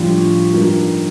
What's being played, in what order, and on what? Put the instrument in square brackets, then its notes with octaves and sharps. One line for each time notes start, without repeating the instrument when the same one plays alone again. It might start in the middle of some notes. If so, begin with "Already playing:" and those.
Already playing: [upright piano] A2 G3 D4 G4 [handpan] F3 F4
[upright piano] G2 D#3 G3 A#3